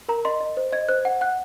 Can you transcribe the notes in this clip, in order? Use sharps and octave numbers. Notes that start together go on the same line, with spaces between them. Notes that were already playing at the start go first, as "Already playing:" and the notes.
A#4 A#5
D#5 C6
D#5
C5
D#5 G#6
C5 F#6
F#5
F#5 F#6